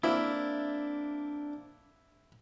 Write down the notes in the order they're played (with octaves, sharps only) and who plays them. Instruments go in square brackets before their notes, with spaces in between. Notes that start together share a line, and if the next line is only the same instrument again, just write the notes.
[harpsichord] A#3 C4 E5 [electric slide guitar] D4 [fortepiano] E4